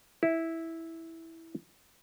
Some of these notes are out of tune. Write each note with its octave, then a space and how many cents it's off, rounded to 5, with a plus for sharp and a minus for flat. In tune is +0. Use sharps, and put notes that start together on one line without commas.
E4 -10